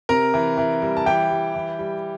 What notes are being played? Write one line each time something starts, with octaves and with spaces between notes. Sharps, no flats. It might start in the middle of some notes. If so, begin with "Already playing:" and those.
C3 A#4 A#5
E3
E3
G3
A5
E3 G4 G5
G3
E3
G3